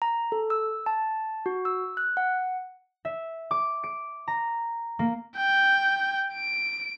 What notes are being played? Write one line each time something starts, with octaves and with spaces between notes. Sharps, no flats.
A#5
A4
E6
A5
F#4
E6
F#6
F#5
E5
D6
D7
A#5
A#3
G5
D7